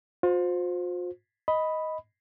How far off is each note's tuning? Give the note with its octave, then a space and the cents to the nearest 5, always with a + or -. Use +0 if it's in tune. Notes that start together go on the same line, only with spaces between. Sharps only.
F4 +40 C5 +0
D#5 +10 B5 +0